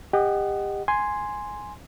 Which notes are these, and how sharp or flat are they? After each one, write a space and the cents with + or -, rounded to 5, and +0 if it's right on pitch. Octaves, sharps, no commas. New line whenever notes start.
G4 +30 D#5 -15 F#5 +20
G#5 +0 C6 +0